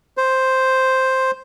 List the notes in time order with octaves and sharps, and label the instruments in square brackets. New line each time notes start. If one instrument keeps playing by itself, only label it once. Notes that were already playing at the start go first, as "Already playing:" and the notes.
[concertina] C5